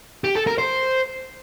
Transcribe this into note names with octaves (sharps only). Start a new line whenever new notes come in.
G4
A4
A#4
C5